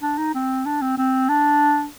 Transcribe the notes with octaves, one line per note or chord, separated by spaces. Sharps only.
D4
D#4
C4
D4
C4
C4
D4